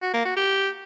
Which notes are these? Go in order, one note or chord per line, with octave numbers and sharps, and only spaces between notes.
F#4
A#3
F#4
G4